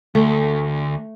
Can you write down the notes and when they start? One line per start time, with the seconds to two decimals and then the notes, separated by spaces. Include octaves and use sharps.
0.15 D2 A3